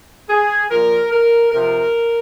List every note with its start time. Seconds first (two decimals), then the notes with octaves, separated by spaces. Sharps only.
0.29 G#4
0.70 A#2 F3 A#4
1.12 A#4
1.52 C3 F3 A#4